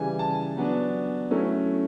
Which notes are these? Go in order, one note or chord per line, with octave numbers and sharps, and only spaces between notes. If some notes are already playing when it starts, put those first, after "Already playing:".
Already playing: C#3 E3 G3 G#5
A5
F#3 B3 D4
F#3 A3 C#4 E4